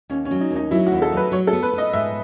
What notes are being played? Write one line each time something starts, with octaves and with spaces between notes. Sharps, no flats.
D#2 C#4
C#4
F#3
D#4
D#2
D#4
F#3 E4
F#4
D#2
A4
F#3 B4
F#3 C#5
A4
B3
B4
B3 D#5
G#2 E5